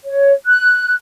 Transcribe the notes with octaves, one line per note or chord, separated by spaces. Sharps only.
C#5
F#6